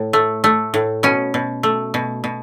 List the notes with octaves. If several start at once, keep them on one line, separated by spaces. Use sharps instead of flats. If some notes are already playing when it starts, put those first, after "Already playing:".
Already playing: A2
A3
A3
A2
B2 C#4
B2
A3
B2
B2